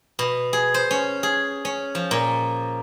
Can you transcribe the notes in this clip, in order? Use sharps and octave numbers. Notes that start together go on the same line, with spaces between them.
B2
G#4
C5
C#4
G#4
C#4
F3
A#2